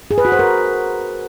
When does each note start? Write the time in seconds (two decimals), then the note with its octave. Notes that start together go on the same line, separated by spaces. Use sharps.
0.11 G#4
0.18 B4
0.25 F#4
0.32 C5
0.39 A#4